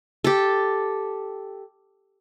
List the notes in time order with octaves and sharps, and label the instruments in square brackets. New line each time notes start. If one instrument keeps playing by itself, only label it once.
[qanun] G4 A4